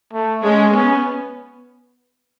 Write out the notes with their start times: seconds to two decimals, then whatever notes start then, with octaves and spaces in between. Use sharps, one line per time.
0.13 A3
0.44 G#3 C#4
0.75 B3 C#4